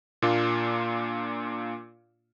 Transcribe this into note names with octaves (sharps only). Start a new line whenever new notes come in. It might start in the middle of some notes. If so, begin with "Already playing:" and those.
A#2 A#3 D4 F4